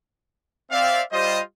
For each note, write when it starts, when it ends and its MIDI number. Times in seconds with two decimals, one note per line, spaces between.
0.71 1.02 60
0.71 1.02 74
0.71 1.02 76
0.71 1.02 77
1.13 1.40 55
1.13 1.40 65
1.13 1.40 72
1.13 1.40 75